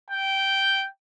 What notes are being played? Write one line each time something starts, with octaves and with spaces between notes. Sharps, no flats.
G5